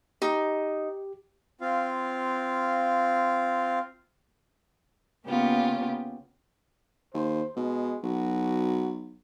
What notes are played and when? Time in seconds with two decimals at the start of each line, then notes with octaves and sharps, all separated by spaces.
0.22 D#4 G4
1.61 C4 F4 F5
5.27 C#3 A#3 B3 C#4 F4 G4
7.14 D#2 C5
7.57 B2 G#3
8.04 B1 F#4